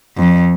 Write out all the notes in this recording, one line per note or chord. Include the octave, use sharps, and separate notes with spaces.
F2